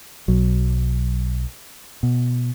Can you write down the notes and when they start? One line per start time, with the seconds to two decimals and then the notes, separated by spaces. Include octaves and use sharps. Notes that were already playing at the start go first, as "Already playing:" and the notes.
0.28 B1 F#3
2.03 B2